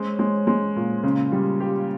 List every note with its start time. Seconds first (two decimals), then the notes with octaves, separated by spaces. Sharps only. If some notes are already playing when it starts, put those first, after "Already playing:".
Already playing: G#3 C#4 C5
0.19 G#3
0.47 G#3
0.76 A#2
1.03 C#3
1.32 G3
1.60 G4